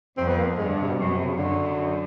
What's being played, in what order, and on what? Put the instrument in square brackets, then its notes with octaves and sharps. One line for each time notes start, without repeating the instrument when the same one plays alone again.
[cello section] F2 [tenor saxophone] C4
[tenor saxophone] B3
A#3
[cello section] G2 [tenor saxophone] G#3
[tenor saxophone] D3
C3
B2
[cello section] F#2 [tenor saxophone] C3
[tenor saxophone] B2
C3
C#3
[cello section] F#2 [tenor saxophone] D3